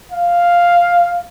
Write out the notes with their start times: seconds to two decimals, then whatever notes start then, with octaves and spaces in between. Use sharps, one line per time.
0.12 F5